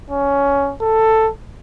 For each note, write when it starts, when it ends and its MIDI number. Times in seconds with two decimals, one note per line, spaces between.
0.11 0.73 61
0.81 1.30 69